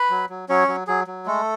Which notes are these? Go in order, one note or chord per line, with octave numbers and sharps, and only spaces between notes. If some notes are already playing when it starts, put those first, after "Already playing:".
Already playing: B4 B5
F#3
F#3
F#3 C#4 C#5
F#3
F#3 G#4
F#3
G#3 A3 A4